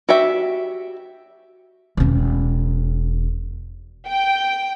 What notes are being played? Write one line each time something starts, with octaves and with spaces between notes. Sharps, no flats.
F#4 G4 E5
E1 C#4
G5